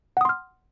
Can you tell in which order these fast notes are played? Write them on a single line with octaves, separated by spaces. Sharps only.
F#5 D#6 C6 F6